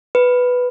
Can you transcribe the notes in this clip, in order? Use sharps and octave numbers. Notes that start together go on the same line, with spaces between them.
B4